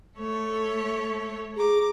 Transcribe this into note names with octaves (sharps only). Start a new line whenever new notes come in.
A3 A4 C#5
G#4 A#5 D6